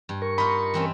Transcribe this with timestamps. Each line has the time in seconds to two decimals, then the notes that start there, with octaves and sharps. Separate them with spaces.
0.09 G2
0.22 A#4 C#6
0.38 D#4 F4 B5
0.74 E3 C4 C#4